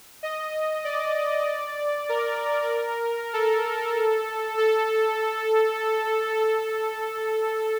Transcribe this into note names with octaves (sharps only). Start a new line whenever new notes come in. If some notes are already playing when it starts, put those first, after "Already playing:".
D#5
D5
A#4
A4
A4
A4